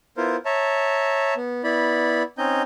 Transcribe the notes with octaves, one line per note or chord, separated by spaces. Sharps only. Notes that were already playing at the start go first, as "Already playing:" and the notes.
B3 E4 F4 A#4 C5
C#5 E5 A5 A#5
B3
B3 E4 D5 B5
C4 C#4 D#4 D#5 G6